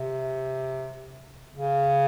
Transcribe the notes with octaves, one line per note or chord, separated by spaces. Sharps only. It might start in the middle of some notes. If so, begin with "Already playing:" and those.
Already playing: C3
C#3